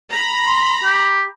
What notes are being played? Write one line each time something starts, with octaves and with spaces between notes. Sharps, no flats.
A#5 B5
C6
G4